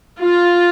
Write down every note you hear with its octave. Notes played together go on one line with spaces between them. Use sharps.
F4